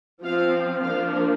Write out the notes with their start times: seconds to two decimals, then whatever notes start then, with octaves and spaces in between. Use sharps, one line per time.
0.24 F3 C4 F5
0.84 F3 A#3 D4 F5